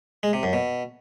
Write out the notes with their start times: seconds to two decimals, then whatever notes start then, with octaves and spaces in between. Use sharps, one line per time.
0.23 G#3
0.33 C3
0.43 F#2
0.53 B2